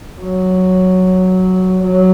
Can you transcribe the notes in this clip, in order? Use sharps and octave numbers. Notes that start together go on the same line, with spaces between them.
F#3
F#3